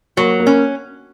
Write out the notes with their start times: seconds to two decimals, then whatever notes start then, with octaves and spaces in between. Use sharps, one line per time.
0.17 F#3 A#3
0.40 A#3
0.47 C#4